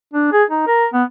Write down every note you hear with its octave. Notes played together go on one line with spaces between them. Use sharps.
D4
G#4
D#4
A#4
B3